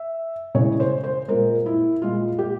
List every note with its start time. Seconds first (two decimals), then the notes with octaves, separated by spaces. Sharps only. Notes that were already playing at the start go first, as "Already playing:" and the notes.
Already playing: E5
0.55 C#3 E3 G#3 C#5
0.80 C5
1.04 C5
1.28 A#2 G#3 A#4
1.66 E4
2.02 A#2 G#3 F4
2.39 G4